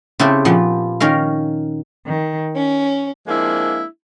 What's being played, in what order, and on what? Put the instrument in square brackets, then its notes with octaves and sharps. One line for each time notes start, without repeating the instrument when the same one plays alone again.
[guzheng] C#3 C4 E4 G4 A4
A#2 F3 B3
D#3 C#4 A#4 F5
[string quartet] D#3
C#4
[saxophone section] F3 G#3 A#3 C4 D4 E4